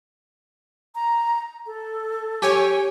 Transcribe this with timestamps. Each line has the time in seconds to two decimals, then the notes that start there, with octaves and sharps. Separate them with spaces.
0.95 A#5
1.67 A4
2.42 G4 C#5 G#5